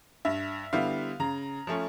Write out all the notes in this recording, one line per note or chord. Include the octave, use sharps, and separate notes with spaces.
G2 E5
D3 G3 B3 E4 F5
C#3 A#5
F3 A3 C#4